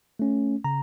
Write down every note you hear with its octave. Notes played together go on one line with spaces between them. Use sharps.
A3 C#4
C#3 A#5